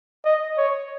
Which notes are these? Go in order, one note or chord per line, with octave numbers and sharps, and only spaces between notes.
D#5
C#5